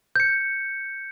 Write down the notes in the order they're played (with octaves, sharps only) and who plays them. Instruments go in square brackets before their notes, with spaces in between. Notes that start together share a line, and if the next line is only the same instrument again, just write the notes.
[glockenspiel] G6 C#7